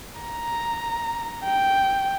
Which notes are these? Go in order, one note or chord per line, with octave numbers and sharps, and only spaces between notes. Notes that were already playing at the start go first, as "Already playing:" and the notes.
A#5
G5